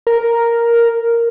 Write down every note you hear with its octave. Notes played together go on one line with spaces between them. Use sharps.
A#4